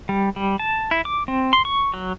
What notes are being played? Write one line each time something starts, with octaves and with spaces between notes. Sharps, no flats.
G3
G3
A5
E4
D6
C4
C6
C#6
F#3